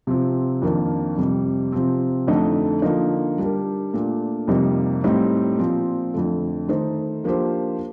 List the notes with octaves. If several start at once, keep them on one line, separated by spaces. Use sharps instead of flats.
C3 F3 C4
F2 D#3 A#3 D4
F2 C3 G3
C3 F3 C4
F2 D3 A3 D#4
D3 F3 A#3 D#4
G3 D4 G4 A#4
A#2 A3 D4
F2 C3 G3 A#3 D#4
A2 G3 C4 D#4 G4
A#2 F3 C4
F2 D3 A3
D#3 A3 D#4 A4 C5
F3 A#3 D4 G4 C5